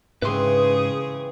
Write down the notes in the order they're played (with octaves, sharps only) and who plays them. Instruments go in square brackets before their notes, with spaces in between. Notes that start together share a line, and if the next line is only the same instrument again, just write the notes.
[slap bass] G#2 [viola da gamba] C#3 G#4 [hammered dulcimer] E3 C4 [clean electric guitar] B4 C6